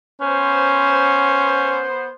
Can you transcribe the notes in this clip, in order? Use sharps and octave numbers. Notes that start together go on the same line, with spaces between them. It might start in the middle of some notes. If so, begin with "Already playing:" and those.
B3 C#4 C5